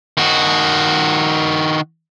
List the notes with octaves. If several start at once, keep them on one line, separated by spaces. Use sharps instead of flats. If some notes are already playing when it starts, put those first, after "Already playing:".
D#3 F#4